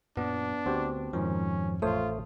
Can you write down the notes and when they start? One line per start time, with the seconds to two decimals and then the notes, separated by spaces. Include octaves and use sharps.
0.17 F#2 A#2 F#3 B3 D4
0.66 D2 C4 F#4 G4
1.13 F2 G#2 D#3 F3 C#4
1.82 A1 A3 F4 C5 C#5 D#6